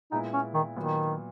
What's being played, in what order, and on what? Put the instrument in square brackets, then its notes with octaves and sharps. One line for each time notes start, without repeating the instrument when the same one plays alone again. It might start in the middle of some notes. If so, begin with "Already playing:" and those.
[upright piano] A#2 G#3 B3 E4 [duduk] D#4
[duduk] C#4
D#3
[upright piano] A#2 F#3 B3 [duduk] D#3